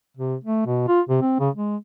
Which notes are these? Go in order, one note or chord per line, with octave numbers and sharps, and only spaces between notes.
C3
A3
B2
F4
C3
C4
C#3
G#3